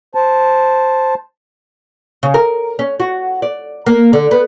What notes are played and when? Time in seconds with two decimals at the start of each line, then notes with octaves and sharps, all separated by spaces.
0.15 C5 A5
2.23 C#3
2.34 A#4
2.79 C#4
3.00 F#4
3.42 D5
3.86 A#3
4.13 D3
4.31 B3